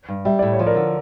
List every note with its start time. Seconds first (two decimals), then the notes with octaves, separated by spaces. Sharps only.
0.09 G2
0.25 G3 E5
0.39 A2 D5
0.53 C#5
0.59 F3
0.66 A#4 D5
0.76 D3